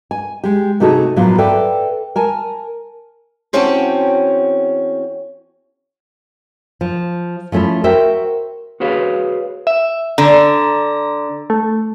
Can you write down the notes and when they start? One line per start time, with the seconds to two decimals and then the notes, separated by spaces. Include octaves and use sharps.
0.11 G#5
0.44 G#3 G4
0.80 C3 A3 D#4 F#4 G#4 A4
1.16 A2 F3 F#3 A#3 B3 F4
1.38 A4 B4 D5 E5 G5
2.16 A#4 G#5 A5
3.53 E2 C4 C#4 F#4 G5 A5
6.81 F3
7.52 F3 A3 C#4 E4 F4
7.84 F#4 A#4 C5 E5 F#5 G5
8.80 F#4 G#4 B4 C#5 F5
9.67 E5
10.18 D3 A#5
11.50 A3